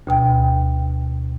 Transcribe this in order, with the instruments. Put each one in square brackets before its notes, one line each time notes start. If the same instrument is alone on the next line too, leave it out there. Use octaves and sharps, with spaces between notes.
[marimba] D2 B2 G5